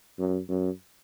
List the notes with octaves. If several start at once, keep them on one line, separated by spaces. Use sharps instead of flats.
F#2
F#2